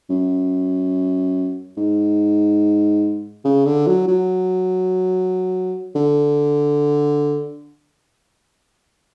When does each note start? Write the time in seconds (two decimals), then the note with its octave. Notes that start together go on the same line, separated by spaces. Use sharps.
0.09 F#2
1.77 G#2
3.45 C#3
3.66 D3
3.87 F#3
4.08 F#3
5.95 D3